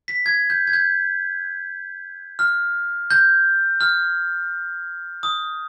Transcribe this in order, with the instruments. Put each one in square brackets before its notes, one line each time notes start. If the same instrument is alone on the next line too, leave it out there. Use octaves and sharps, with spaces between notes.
[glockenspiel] B6
G#6
G6
G#6
G6
F6
G6
F6
D#6